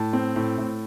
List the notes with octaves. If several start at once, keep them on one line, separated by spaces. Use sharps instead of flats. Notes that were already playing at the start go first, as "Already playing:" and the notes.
Already playing: A2 A5
C4
A2
A2